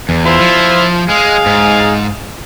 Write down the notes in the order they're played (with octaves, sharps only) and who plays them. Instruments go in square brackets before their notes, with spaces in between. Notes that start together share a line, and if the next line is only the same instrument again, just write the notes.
[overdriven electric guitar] E2
[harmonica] E4 F4 C5
[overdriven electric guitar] F3
[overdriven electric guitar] G#3 [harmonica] G#4 F5
[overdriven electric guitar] G#2